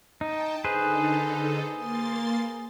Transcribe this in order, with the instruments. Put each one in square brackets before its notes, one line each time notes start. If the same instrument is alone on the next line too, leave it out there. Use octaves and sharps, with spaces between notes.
[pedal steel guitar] D#4 [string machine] G5 A5
[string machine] D3 D#4 A4 [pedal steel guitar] G#4 B4 C5
[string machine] A#3 C6 A6